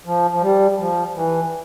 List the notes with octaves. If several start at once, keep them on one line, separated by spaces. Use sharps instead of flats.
F3
F3
G3
F3
E3